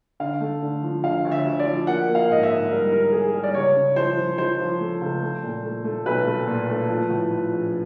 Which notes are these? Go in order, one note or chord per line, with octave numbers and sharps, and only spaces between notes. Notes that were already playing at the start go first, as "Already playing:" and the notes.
D3 F5
A3
D3
F3
D3 F5
D2
E5
D2
D5
F3
A#3 F#5
A#3
F5
G#2 D#5
E5
G#2
G3 A#4
A#3 A#4
A#3 G#4
G3
D5
C#2 C#5
C#3
F3 C5
F3
F3 C5
F3
A3
C#2
A3
A#2
A3
A3
B1 B4
A3
A#2
A3
F3
A2
F3
A#1